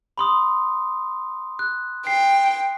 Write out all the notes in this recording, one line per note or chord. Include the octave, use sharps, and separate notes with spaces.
B5 C6 D#6
F#6
G5 C7